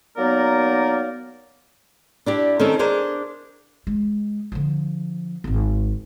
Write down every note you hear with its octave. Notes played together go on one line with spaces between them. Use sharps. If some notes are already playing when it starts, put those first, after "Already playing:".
F#3 A#3 B3 D#4 A#4 D5
D4 E4 G4
D#3 C4 C#4 A4 A#4
D4 G#4 A#4 C5
G#3
D3 F3
D1 G#1